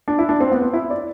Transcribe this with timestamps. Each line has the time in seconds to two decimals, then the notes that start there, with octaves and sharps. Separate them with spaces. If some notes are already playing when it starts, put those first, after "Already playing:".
0.08 D4
0.18 E4
0.29 D4
0.40 C4
0.52 B3
0.62 C4
0.73 E4
0.90 D5